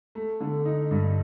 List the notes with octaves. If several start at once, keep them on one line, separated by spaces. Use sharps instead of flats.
A3
D3
D#4
G2